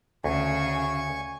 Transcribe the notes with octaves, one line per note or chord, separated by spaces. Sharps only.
D2 C#3 G#5 C#6